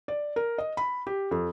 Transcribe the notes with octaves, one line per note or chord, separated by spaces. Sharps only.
D5
A#4
D#5
B5
G4
F2